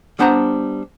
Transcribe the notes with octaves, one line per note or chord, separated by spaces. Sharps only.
G3 B3 D4 C5 F#5 A#5